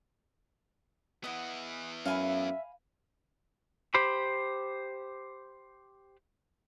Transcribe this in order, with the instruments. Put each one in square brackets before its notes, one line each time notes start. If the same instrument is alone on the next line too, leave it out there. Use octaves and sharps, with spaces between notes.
[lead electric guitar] B3 E4 [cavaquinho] D#5 F#5
[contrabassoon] F#2 [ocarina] E5 [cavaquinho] F5 G#5 B5
[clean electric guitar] G4 C5 B5